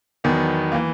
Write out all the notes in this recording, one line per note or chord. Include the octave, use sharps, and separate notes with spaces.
E2 D#3 F#3 B3
A#3
E3